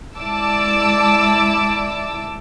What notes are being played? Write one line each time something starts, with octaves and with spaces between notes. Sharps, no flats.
G#3 E4 D5 A5 D6 E6